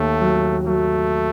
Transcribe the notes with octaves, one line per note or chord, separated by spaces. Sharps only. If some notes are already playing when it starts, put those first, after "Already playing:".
Already playing: D#2 A3
F#3
F#3 A3